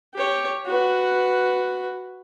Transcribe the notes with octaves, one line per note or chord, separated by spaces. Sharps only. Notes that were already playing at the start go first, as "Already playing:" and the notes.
G4 C#5
F#4 B4